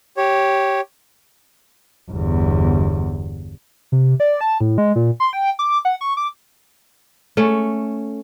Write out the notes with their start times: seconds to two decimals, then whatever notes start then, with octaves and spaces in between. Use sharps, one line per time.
0.17 G4 C#5
2.10 G1 E2
3.92 C3
4.20 D5
4.41 A5
4.61 A2
4.78 G#3
4.96 A#2
5.20 C6
5.33 G5
5.59 D6
5.85 F#5
6.01 C#6
6.17 D6
7.37 A3 C#4